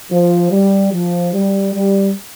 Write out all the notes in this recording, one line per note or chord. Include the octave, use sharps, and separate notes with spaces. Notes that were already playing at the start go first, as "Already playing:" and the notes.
F3
G3
F3
G3
G3